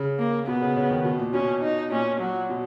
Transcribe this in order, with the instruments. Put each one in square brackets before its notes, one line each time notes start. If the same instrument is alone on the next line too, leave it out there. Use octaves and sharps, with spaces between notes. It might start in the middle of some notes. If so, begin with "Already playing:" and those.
Already playing: [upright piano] C#3
[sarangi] A#3
[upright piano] B2 [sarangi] B3
[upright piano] C#3
C#3
D#3
B2
A#2
[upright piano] B2 [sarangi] C#4
[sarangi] D#4
[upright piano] A#2 [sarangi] C#4
[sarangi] F#3
[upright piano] B2